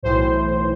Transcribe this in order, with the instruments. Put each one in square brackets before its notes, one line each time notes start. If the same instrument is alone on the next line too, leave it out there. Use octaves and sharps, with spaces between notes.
[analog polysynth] B1 A2 E3 C5